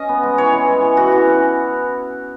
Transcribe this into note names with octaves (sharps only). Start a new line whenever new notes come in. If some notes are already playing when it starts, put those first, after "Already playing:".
Already playing: C#4 D#5
B3
G#3
E3 C#5
E3
G#3
E3
E3 F#4
E3
C#4